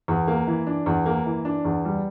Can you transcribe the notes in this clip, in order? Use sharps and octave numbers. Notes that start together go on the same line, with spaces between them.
E2
A#3
E3
D4
E2
A#3
E3
D4
E2
G3